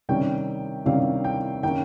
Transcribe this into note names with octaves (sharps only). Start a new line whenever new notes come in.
C3 D#3 G3 C#4 G5
C3 D#3 G3 C#4 F5
G5
D#3 A#3 C#4 G5